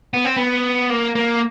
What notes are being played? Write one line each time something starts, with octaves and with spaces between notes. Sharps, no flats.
B3
C4
B3
A#3
A#3